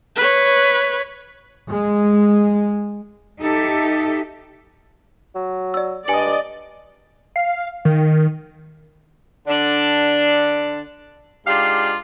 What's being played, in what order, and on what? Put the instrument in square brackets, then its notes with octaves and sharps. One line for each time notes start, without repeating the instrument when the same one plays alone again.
[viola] B4 C#5
[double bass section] G#3
[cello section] D#4 G4 A4 E5
[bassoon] F#3
[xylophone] D5 E6
[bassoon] G2 [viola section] D5 D#5 [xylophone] G#5 C#7 F#7
[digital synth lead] F5
D#3
[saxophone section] D3 D4
G#2 D4 F4 G4 F5